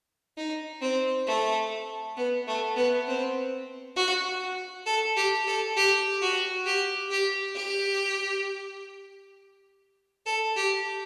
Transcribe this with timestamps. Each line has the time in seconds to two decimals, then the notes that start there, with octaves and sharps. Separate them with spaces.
0.37 D#4
0.82 C4
1.27 A3
2.17 B3
2.47 A3
2.76 B3
3.07 C4
3.96 F#4
4.86 A4
5.16 G4
5.47 A4
5.76 G4
6.22 F#4
6.66 G4
7.11 G4
7.56 G4
10.26 A4
10.56 G4